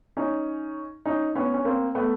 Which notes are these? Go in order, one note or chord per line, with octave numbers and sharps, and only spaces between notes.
C#4 D#4
C#4 D#4
B3 C#4
C#4
A#3 C4
A3 B3